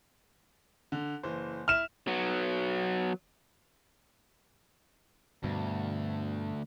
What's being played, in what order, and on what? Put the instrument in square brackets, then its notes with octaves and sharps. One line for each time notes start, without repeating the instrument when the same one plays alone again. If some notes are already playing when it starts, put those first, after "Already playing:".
[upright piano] D3
F#1 E3 C5
[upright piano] E4 [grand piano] F6 E7
[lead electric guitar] F#3 B3
[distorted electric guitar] D2 [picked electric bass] G2 B2